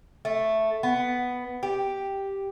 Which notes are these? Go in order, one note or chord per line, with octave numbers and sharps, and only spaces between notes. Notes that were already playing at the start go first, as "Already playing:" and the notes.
A3
B3
G4